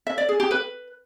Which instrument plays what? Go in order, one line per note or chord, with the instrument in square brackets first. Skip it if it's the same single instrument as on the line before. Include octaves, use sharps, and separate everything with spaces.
[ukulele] E5
D5
G#4
G4
B4